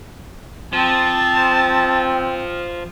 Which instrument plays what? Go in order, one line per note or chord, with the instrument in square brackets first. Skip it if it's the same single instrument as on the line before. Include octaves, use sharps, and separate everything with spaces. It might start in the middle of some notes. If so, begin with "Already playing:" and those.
[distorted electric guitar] F3 [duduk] C4 [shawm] A5